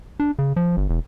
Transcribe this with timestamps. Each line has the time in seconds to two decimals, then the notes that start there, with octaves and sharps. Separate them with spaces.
0.20 D4
0.39 C#3
0.56 F3
0.77 G1
0.89 E1